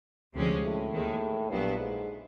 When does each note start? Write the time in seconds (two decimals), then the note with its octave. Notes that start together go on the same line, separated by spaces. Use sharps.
0.34 D2 C3 F3 G#3 C#4
0.64 A2
0.92 D#2 D#3 G#3
1.49 A#1 G2 A#2 F#3 B3 E4
1.79 G#2